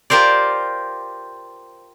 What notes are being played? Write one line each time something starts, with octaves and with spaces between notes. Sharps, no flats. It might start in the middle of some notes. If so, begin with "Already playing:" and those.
F4 G4 A#4 C5 D5